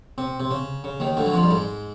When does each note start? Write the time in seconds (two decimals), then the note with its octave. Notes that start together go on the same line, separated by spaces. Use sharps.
0.18 C3
0.40 C3
0.51 C#3
0.84 C#3
1.00 D#2 D#3
1.17 D2 D3
1.25 F#3
1.34 F2 F3
1.42 G3
1.50 G#2 G#3